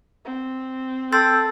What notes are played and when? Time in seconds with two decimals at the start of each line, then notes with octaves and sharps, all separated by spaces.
0.25 C4
1.12 A4 G5 C6 E6 A6